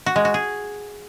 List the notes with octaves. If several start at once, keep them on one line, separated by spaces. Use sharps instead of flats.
F#4
G#3
F#4
G#4